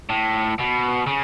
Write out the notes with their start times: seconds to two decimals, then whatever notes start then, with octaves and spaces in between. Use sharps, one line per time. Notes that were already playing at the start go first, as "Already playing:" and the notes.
0.10 A2
0.59 B2
1.07 C#3